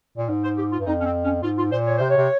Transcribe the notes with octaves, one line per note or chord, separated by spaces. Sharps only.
A#2
G#2
C5
G4
F4
G2
F2 D#4
C#4
C4
C#4
G#2 F4
F4
A#2 C5
C#5
C3 C5
C#5
C3